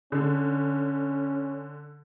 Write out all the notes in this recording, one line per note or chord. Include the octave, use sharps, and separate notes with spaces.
D3 C#4